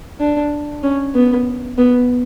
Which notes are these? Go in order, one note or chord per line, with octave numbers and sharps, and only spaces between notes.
D4
C#4
B3
B3